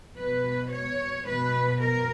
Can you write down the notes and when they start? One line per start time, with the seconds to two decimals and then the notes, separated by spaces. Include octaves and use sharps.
0.18 B2 B4
0.72 C#5
1.27 B2 B4
1.82 A#4